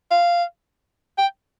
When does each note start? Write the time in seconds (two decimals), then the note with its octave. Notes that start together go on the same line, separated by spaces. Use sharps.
0.11 F5
1.18 G5